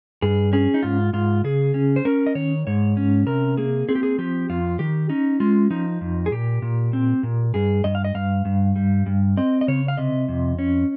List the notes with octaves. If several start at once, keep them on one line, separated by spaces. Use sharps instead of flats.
G2 G#4
C#4 G#4
D#4
G#2 F4
G#2 F4
C#3 G#4
C#4
C5
C#4 A#4
D#5
D#3 C#5
G#2 C#5
C#4
C3 A#4
A#3 G#4
C4 G#4
G4
G#4
F3 G4
F2 F4
D#3 G4
C#4 D#4
G#3 F4
F3 D#4
F2
G#4
A#2 G4
A#2
C4
A#2
G2 G#4
G2 D#5
F5
D#5
G2 F5
G2
G3
G2
C4 D#5
D#5
C#3 C#5
F5
C3 D#5
F2
C#4